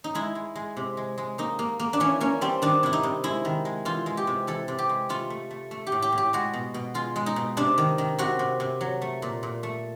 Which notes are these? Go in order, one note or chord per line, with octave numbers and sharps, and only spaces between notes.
D#4
G#3 E4
G#3
G#3
C3
G#3
G#3
A#3 D#4
A#3
A#3
D4
E3 C#4
A#3 C#4
G3 C4
D#3 D4
C3 E4
D#4
C3
G#3 E4
D#3
G#3
E3 F4
G#3
G4
C3
E3 A4
C3
G4
G#3
A3 F4
A3
A3
A3
G4
A2
G4
A2
G4
G#3 F#4
B2
B2
G#3 F4
G#3
D#4
B2
C3 D4
D#3
D#3
C3 F#4
C3
C3
F#3
A3
A#2
A#2
A3